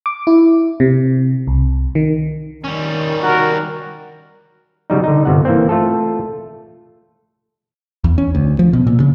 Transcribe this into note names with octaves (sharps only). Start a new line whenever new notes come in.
D6
E4
C3
C2
D#3
D#3 G3 C#4
F#4 A#4
C#3 F#3 G3 D#4
D3 D#4
G1 C3 F#5
E3 A#3 C4
A3 F4 A4
E2
C#4
D2
F3
B2
A#2
C#3